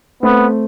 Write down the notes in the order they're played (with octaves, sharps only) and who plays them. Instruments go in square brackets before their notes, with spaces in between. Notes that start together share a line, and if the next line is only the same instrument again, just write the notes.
[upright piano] A3 C4 [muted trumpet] B3